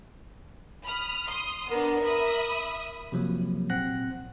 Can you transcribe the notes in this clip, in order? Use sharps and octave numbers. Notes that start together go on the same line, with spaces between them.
B5 D#6 F6
C6 D#6
B3 D4 A#4
E5 B5 D#6
C3 F3 F#3 A#3
A#2 C4 F#5 F#6 A#6